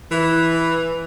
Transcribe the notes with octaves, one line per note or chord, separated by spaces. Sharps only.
E3